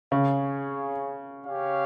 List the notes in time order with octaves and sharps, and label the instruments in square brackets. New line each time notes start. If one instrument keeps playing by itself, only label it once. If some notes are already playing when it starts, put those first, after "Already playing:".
[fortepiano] C#3 [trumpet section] C#4 G#4 C#5 F5
[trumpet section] C#4 G4 C#5 F5